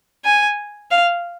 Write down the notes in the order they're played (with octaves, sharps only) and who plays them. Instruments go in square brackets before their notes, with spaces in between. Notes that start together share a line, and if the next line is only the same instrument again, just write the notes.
[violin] G#5
F5